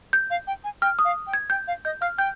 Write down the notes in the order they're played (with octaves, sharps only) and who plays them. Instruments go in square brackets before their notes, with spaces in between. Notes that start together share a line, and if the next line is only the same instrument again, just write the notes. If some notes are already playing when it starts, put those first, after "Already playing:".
[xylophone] G6
[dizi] F5
G5
G#5
[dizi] G5 [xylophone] F6
[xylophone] D#6
[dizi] F5
G5
[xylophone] G#6
[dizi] G5 [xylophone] G6
[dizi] F5
[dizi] D#5 [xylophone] G6
[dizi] F5 [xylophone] F6
[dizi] G5 [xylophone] G6